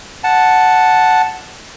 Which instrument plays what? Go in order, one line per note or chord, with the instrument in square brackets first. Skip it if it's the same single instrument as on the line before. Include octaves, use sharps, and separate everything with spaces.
[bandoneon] F#5 A5